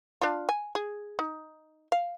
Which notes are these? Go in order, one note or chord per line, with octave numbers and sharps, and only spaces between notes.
D4 F4
G#5
G#4
D#4
F5